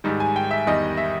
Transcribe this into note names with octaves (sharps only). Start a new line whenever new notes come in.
G#2 D#3 G3
G#5
G5
E5
E2 D#3 G3 D#5
E5